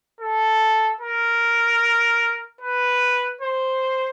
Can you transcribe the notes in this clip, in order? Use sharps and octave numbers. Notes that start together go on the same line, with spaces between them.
A4
A#4
B4
C5